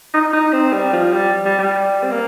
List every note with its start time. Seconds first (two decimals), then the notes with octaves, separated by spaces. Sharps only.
0.13 D#4
0.33 D#4
0.53 C4
0.72 G3
0.93 F3
1.12 G3
1.45 G3
1.59 G3
2.04 C4
2.12 A#3